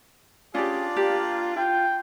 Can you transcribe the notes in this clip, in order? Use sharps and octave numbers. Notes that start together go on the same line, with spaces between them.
C#4 D4 F4 G4 G#4 D5
A#3 G4
F4 G5